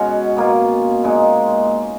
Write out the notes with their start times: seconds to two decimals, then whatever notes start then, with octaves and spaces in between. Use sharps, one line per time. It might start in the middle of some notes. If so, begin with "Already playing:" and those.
Already playing: B2 G#3 C#4 F#4
0.36 B2 A#3 F4
1.04 A#2 G#3 D#4